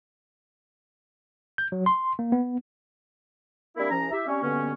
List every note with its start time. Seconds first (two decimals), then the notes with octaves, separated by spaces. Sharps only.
1.58 G6
1.72 F#3
1.86 C6
2.19 A#3
2.32 B3
3.77 G3 A#3 C4 D4 E4
3.90 C2 F3 C#4 A#5
4.11 E4 G4 E5
4.27 G3 C4 C#4
4.43 G2 B2 D3 A#3 B3 C#4